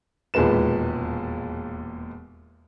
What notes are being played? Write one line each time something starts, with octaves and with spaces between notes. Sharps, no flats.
E1 D#2 A#2 G#3 B4 E7